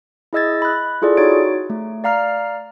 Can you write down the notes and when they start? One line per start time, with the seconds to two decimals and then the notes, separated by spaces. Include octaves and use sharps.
0.33 E4 G#4 D#5 E6 G#6 A6
0.62 B5 F#6
1.02 E4 F4 G#4 A4 D5
1.17 D#4 F#4 C#5 A6 D7
1.70 A3
2.04 D5 F5 A#5 F6 C7